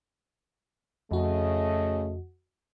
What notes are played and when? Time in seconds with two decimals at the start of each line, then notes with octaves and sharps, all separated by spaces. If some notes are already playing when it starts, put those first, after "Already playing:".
1.11 F2 C#3 A3 F#4 D#5